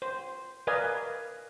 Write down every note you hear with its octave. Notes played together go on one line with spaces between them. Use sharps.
C5
A#4 B4 D5 D#5 F5 G#5